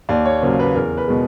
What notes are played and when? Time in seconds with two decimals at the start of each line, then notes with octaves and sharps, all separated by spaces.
0.09 D#2 D5
0.25 C#5
0.43 C#3 F#3 A#3 C5
0.59 B4
0.76 E2 A#4
0.97 B4
1.08 B2 G#3